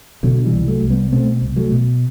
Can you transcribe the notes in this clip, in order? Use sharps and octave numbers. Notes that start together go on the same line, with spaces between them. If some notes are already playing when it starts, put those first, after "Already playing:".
B2 D3 F#3
E3 G3
C2
F#3 A3
C2
G3 B3
B2 A3 C4
C2
F#3 A3
B2